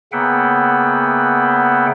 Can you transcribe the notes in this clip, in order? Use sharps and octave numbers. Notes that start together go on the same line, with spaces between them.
C#3 A#3 B3 E5 F#5 G5